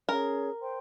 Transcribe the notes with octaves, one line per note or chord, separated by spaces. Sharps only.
C#4 G#4 A#4 C#5
C5 G5 C6